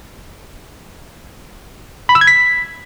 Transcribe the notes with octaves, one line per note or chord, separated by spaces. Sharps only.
B5
E6
G#6
B6